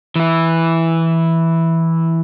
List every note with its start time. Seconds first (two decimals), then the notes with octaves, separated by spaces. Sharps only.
0.16 E3 E4